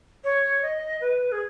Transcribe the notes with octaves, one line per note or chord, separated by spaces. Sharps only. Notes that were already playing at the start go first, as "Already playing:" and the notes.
C#5
D#5
B4
G#4